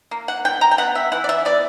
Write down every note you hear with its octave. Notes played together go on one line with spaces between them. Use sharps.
A#3
F#5
B2 G5
A#5
G5
B3 F#5
E5
E3 F#5
D5
E5
B3 D5